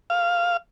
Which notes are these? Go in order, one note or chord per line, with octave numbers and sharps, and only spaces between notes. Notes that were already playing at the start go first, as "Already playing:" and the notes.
F5